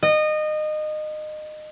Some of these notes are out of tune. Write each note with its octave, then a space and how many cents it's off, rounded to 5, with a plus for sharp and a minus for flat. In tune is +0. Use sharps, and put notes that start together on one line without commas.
D#5 -25